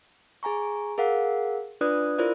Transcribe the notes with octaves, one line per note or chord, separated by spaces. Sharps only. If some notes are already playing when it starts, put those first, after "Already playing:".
G#4 G#5 A#5 C#6
G#4 A#4 F5 F#5
D4 F4 B4 D5 D#6 F#6
E4 F4 A#4 C5 D5